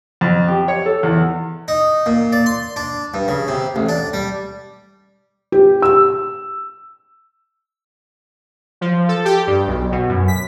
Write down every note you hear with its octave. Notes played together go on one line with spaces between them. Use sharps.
F2
G4
C#5
A4
E2
D#4
A#2
D5
C6
D4
G2
C#3
C3
A1
D4
G3
G4
E6
F3
A4
G4
G2
B1
B2
F#2
B6